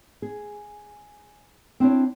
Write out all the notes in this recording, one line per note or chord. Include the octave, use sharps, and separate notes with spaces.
G#4
C4 D4 E4 C#5